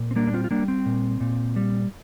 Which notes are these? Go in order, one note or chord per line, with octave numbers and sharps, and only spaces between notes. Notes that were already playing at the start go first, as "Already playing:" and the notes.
Already playing: A#2
C4
G3 A#3 D4
D4
C4 F4
F4
G3 A#3 D4
C4
A#2
A#2
G3